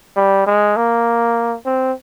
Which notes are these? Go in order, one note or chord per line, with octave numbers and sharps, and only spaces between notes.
G3
G#3
A#3
C4